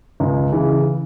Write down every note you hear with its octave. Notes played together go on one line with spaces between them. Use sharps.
C#2
C#3 E3